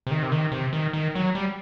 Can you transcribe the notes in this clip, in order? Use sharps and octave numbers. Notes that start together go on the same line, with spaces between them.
C3
D#3
C3
D#3
C3
D#3
D#3
F#3
G3